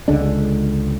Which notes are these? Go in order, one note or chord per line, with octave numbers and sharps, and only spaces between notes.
C#2 D3 G#3 D4